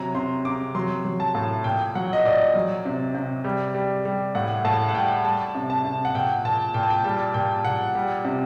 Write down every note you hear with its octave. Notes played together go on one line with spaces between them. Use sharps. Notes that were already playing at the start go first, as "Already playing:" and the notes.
Already playing: C3 F#3 A#5
C3 C6
C3 D6
F#3 C6
F#3
A5
A2
A#2 G5
F#3 F#5
D#5
A#2 D5
F#3
C3
C3
G3
G3
G3
A2 F#5
A2 A5
F#5
G3 G5
G3 A5
C3
A5
C3
F#5
A#2 G5
A#2 A5
A#2 G5
A5
G5
G3 A5
A#2 G5
A#2 F#5
G3
C3